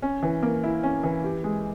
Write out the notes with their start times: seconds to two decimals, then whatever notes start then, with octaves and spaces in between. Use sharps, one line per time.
0.02 C#4
0.23 E3
0.43 A#3
0.64 E4
0.83 C#4
1.03 E3
1.24 G4
1.44 G#3